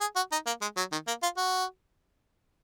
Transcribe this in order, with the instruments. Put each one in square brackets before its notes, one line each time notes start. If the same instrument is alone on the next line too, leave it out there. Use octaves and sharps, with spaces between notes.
[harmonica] G#4
F#4
D#4
A#3
G#3
F#3
D#3
A#3
F4
F#4